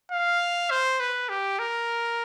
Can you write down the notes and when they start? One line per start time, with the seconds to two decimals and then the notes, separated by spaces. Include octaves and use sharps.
0.12 F5
0.70 C5
1.00 B4
1.29 G4
1.59 A#4